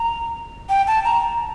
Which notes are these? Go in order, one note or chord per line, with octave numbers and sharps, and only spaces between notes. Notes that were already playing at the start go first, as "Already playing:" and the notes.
Already playing: A#5
G5
A5
A#5